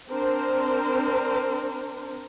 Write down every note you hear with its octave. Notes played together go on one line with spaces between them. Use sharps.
C4 D4 A#4 C5